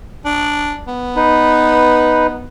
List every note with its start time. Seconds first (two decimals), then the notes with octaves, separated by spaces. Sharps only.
0.25 D4
0.87 B3
1.16 D#4 B4